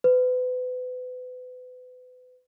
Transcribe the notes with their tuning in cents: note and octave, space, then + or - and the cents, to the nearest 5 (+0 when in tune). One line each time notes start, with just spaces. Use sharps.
B4 +35